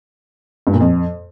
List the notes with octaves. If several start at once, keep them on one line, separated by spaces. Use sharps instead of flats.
G2
A#2
F2